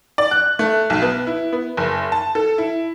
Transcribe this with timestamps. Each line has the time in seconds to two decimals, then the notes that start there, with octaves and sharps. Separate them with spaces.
0.18 D5
0.31 F#6
0.59 A3
0.90 B1
1.02 B3
1.27 E4
1.52 B3
1.77 F#1
2.12 A5
2.35 A4
2.58 E4